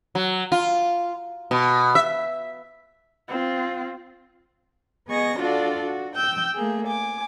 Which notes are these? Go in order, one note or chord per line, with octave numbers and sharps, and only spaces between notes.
F#3
F4
B2
E5
C4 F4
B3 G#4 D#5 C#6 A#6
D4 F4 F#4 A4 D5
F#4
G5 E6 G6
A3 A#3 G#4
G#5 D6